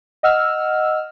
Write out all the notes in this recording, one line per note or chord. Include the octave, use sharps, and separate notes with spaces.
D#5 F#5 E6 F6